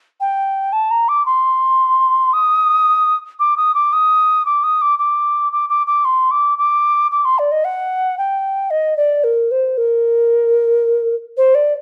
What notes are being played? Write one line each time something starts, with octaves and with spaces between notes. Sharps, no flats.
G5
A5
A#5
D6
C6
D#6
D6
D#6
D6
D#6
D6
D#6
D6
D6
D6
D6
D6
C6
D6
D6
D6
C6
D5
D#5
F#5
G5
D#5
D5
A#4
C5
A#4
C5
D5